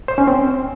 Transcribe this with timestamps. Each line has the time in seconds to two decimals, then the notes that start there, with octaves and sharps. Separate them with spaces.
0.08 C5
0.18 C#4
0.27 C4